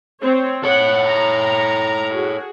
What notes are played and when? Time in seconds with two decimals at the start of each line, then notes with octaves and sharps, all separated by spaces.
0.19 C4 C#5
0.64 A4 C#5 F#5
1.08 A#5
2.12 F#4 G#4